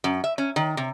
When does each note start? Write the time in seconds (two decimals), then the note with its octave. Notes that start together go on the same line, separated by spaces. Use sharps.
0.04 F#2
0.24 E5
0.38 C#4
0.56 D#3
0.77 C3